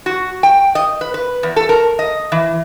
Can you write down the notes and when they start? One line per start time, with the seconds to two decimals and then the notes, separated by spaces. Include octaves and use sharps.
0.06 F#4
0.43 G5
0.75 D#5
1.01 B4
1.14 B4
1.43 E2
1.56 A4
1.69 A#4
1.99 D#5
2.32 E3